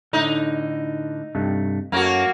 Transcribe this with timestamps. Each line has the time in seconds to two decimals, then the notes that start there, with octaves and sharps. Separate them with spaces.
0.13 A2 D3 D#4
1.35 G2 C3 A3
1.92 F#2 A3 A#3 F#4 C#5